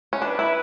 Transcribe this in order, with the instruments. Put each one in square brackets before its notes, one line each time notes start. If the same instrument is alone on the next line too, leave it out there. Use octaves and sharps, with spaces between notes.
[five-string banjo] C#4
[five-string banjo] D4 [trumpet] B4
[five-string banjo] E4